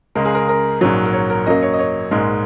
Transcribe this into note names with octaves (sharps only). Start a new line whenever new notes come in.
C#2 C#3 G#3 A#4
G#4
A#4
A#4
A#1 G#2 F#3
A#4
C#5
A#4
F#2 F#3 A#3 D#5
C#5
D#5
C#5
A#1 G#2 G#3 A#4